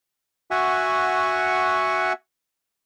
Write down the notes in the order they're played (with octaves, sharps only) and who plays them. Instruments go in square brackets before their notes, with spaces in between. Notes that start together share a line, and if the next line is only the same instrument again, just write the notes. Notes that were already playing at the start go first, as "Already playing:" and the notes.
[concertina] F#4 E5 F#5 G#5 C#6